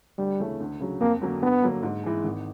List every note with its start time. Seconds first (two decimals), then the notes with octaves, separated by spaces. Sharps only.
0.18 D2 G3
0.39 C#3 E3 A3 C#4
0.60 D2
0.80 C#3 F#3
1.00 F2 A#3
1.21 D3 F#3 A#3 C#4
1.42 G2 B3
1.62 D3 F#3 A#3
1.83 G#2
2.04 E3 G#3
2.24 G#1